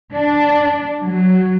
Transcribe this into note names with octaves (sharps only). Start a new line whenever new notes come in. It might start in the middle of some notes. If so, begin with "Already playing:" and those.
D4
F#3